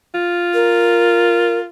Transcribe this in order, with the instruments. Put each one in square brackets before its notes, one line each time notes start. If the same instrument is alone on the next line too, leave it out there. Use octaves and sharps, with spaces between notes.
[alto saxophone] F4
[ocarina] A#4